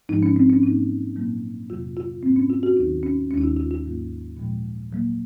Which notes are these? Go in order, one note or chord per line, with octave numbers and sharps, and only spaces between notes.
G#2 F3 G#3 D#4
C#4
C4
C#4
G#2 F#3 A#3 D#4
A#2 F#3 A#3
F2 C3 F#3 F4
F4
G#2 F#3 A#3 C4
C#4
F4
F#4
D#2 D#3 F#3 D#4
C#4
D#2 D#3 G#3 C#4
D#4
F4
F4
F4
G#2 F#3 A#3
A#2 F3 G#3
A#2 F#3 A#3